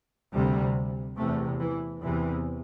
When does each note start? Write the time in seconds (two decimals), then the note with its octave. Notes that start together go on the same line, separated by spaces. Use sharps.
0.32 D2 C3 G3
1.17 E2 C3 A3
1.59 E3
2.02 E2 C3 E3